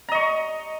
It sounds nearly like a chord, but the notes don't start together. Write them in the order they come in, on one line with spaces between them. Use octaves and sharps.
A#5 D#5 C#6